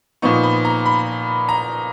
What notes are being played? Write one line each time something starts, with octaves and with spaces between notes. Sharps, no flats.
A#2 F3 B3 D#4 C#6
B5
A#5
B5
A#5